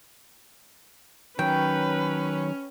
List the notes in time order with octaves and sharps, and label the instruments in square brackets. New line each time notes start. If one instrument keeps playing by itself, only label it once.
[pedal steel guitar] D#3 F#3 [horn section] C#4 [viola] B4 [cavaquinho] G5